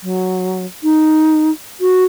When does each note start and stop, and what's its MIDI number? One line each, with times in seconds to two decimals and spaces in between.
0.01 0.65 54
0.83 1.50 63
1.80 2.04 66